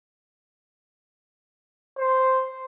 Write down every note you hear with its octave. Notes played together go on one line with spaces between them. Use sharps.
C5